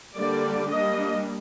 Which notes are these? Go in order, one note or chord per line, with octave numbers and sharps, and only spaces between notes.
D3 G3 A#3 D5
G3 A#3 D4 D#5